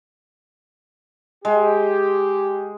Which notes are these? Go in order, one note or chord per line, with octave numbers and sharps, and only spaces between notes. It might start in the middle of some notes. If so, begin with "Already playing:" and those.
G#3 G4